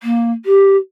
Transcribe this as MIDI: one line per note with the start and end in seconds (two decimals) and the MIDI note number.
0.03 0.31 58
0.45 0.76 67